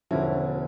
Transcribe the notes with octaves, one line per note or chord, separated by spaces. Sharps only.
E1 E2 D3 F3 C#4 E4